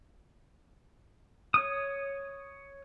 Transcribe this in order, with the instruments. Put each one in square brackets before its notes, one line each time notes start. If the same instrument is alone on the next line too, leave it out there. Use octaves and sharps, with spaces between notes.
[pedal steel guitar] C#5 D#6